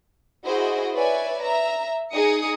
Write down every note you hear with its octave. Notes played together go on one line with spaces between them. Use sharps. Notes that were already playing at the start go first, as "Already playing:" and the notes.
E4 F#4 G#4 C5 D#5
B4 C#5 D5 E5 G#5
E5 A#5
D#4 G#4 D#6 C#7